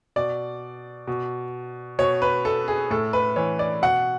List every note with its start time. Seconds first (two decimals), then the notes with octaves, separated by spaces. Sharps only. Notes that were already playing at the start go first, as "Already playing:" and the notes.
0.16 B2 D5
1.07 B2
1.99 B2 C#5
2.22 B4
2.45 A4
2.68 G#4
2.90 A2 A4
3.13 B4
3.36 E3 C#5
3.59 D5
3.82 B2 F#5